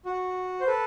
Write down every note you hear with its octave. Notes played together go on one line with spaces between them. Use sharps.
F#4
C5
A4 B4